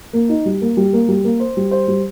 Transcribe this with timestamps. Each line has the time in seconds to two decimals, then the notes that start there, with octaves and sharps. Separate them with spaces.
0.13 A#3
0.29 D#4
0.46 G3
0.61 A#3
0.77 G3
0.93 A#3
1.08 G3
1.24 A#3
1.40 C5
1.57 G3
1.71 C5
1.88 G3